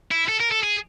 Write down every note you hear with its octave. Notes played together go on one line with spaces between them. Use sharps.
E4
A4
A#4
A4
G#4